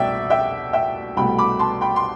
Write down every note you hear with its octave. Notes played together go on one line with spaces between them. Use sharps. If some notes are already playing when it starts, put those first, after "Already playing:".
Already playing: C2 B2 A3 D5 E5 G5
E5 G5
E5 G5
C2 B2 A3 G5 B5
B5 D6
A5 C6
G5 B5
C6